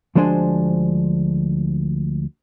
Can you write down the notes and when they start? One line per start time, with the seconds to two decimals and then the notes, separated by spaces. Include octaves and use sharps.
0.15 D2 F3 G#3 D4 C5 G#5